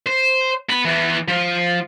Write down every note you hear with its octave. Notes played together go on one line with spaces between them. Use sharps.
C5
B3 B5
E3 B3
F3